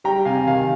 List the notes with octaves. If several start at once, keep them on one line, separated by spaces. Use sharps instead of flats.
G3 G5 A#5
C3 F5 G#5
D#3 F5 G#5